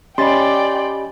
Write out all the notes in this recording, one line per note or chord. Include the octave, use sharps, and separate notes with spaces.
C#4 G4 D5 D#5 G5 B5 C6 A6